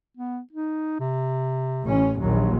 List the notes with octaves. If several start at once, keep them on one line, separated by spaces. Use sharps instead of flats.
B3
D#4
C3
A1 C#4
A#1 D#2 F#3